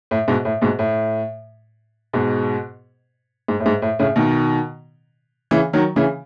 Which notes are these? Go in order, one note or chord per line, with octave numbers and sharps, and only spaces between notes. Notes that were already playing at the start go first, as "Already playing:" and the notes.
A2
G#2 B2
A2
G#2 B2
A2
G#2 B2
G#2
A2
G#2
A2
A2 C#3
B2 D#3
C#3 E3
D#3 F#3
C#3 E3